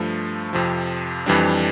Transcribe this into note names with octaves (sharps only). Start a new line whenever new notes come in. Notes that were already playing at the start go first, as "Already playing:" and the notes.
Already playing: G2 F3 A3
F2 C3 F3
F2 E3 G3 D4